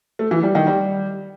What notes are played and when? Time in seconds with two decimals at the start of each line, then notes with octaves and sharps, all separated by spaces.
0.19 A3
0.31 E3
0.43 G3
0.55 D#3
0.67 G3